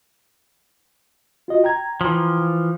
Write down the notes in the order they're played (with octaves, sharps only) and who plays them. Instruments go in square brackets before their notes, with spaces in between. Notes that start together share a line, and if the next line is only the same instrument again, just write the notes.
[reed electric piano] F4 F#4 D#5
G5 A#5 G#6
[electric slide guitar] E3 F3